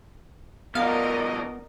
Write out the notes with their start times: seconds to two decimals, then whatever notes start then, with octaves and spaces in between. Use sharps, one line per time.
0.75 B2 F3 B3 A#4 D5 D#5 F5